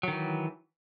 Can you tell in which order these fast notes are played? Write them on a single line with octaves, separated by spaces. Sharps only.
F#3 D#3 E3